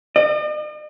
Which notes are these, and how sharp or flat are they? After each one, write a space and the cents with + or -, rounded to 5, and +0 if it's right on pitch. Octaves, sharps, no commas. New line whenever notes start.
D#5 -45